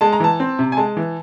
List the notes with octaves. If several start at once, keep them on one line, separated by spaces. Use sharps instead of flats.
G#3 A5
A#5
E3 A5
C4
C3
G#5
G#3 A5
E3